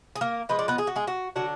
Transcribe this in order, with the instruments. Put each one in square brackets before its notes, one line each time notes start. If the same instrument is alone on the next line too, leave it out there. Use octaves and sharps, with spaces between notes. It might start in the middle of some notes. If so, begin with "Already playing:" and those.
[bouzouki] G#4
A#3 A#4
F3 G#3 D#4 B4
D5
B3 B4
G#4
F#4
G#3 G#4
F#4
D3 F#3 D4 F#4